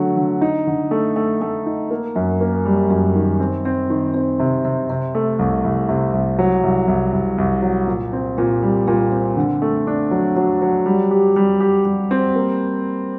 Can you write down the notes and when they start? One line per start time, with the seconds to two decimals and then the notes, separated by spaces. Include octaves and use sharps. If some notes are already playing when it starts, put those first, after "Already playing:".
Already playing: D3 F#3 A3
0.17 D3
0.41 D#4
0.67 D3
0.91 A3
1.16 A3
1.41 A3
1.66 D#4
1.91 A#3
2.16 F#2
2.41 A#3
2.65 G3
2.90 F#2
3.15 D#3
3.40 C4
3.65 C4
3.90 D#3
4.14 C4
4.39 C3
4.64 C3
4.90 C3
5.15 A3
5.39 C2
5.64 C2
5.89 C3
6.13 C2
6.39 F#3
6.63 C2
6.88 C2
7.13 C2
7.38 C2
7.62 F#3
7.87 A#2
8.13 C4
8.38 A#2
8.62 G3
8.88 A#2
9.12 C4
9.37 D3
9.62 A3
9.87 D4
10.11 F#3
10.36 F#3
10.62 F#3
10.86 G3
11.11 G4
11.36 G3
11.60 G4
11.85 G3
12.11 C4
12.35 A#3